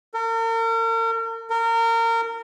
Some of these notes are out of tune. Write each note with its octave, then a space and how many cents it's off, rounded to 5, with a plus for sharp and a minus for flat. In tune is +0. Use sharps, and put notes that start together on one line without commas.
A#4 -40
A#4 -25